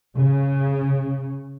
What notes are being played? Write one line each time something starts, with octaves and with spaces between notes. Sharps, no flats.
C#3